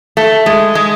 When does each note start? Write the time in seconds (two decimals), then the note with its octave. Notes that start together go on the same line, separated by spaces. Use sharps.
0.17 A3
0.46 G#3
0.75 G#3